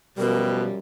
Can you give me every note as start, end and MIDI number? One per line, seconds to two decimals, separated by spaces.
0.18 0.77 42
0.18 0.67 47
0.18 0.77 53
0.18 0.77 55
0.18 0.56 70